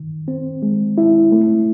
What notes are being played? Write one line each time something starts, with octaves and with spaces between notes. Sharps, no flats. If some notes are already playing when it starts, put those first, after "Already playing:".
Already playing: D#3
C4
G#3
E4
A3